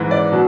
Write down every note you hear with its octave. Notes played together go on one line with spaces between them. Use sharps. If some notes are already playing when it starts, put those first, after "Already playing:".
Already playing: G#2 E3
D5
B2 F#3